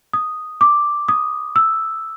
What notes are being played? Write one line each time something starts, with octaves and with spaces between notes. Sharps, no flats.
D#6
D6
D#6
E6